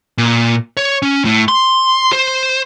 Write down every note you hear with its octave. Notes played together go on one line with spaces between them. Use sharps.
A#2
C#5
C#4
A2
C6
C5